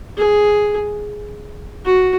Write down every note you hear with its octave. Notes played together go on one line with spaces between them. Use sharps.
G#4
F#4